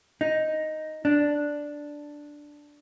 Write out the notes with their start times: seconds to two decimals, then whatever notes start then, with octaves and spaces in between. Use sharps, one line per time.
0.21 D#4
1.05 D4